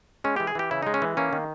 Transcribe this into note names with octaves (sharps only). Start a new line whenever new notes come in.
G#3 C#4
E3 G4
G#4
E3 G4
C#3 E4
G#3 D#4
C#4
E3
A#3 C#4
D#3